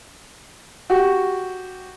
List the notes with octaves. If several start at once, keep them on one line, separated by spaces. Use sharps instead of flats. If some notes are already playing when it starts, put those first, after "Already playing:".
F#4 G4